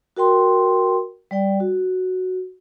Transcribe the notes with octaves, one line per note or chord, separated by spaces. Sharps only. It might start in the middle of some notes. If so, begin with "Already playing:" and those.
F#4 A#4 G5 C6
G3 D5 G5
F#4